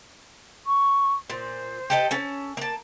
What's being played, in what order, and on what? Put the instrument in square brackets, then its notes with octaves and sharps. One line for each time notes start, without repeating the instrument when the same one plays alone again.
[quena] C#6
[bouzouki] A#2 [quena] C5
[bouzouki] G4 A4 D#5
C#4 A4
A#3 A5